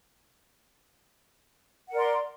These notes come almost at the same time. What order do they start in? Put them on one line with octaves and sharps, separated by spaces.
F#5 A#4 D5 C6